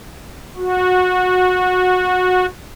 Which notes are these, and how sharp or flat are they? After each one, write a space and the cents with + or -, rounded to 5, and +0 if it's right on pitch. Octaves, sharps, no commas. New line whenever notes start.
F#4 -20